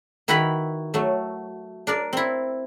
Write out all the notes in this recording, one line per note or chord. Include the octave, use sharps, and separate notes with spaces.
D#3 E4 F#4 B4 A#5 B5
F#3 A3
D4 A#4 D5
C4 E4